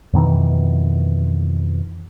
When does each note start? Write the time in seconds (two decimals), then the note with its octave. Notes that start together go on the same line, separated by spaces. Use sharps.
0.13 F2 B2 D#3 E3